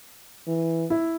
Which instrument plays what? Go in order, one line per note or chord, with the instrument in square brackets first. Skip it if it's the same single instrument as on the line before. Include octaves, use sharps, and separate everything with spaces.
[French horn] E3
[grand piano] E4